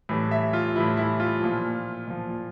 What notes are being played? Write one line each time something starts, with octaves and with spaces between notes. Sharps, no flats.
A2 E3 G3
E5
F4
A2 E3 G3 E4
E4
F4
A#2 F3
A#2 F3